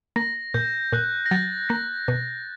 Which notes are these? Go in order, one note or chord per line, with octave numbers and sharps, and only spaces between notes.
A#3 A#6
A#2 G6
A#2 F#6
A#6
F#3 A6
A#3 A#6
B2